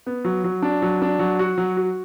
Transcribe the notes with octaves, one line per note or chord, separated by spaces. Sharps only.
B3
F#3
F#3
D4
F#3
D4
F#3
F#4
F#3
F#4